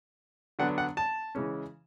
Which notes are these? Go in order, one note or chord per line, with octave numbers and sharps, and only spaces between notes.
D3 F#3 B3 D4 F#5
F#5
A5
C#3 E3 G#3 C#4